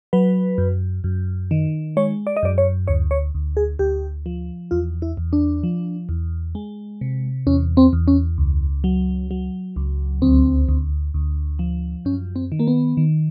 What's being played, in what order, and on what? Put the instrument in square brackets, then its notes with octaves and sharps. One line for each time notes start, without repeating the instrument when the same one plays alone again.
[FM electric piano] F#3 B4
F#2
F#2
D#3
G#3 C#5
D5
D#5
F#2 D5
C#5
D2 C#5
C#5
D2
G#4
D2 G4
F3
E2 F4
E4
E2
D4
F3
E2
G#3
C3
E2 C#4
C4
E2
C#4
C#2
F#3
F#3
C#2
D2 C4
D2
D2
F3
F#2 C#4
C4
D#3
A#3
B3
D#3